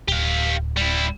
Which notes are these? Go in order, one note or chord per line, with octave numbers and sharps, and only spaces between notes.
D1 G4 F5
G3 E4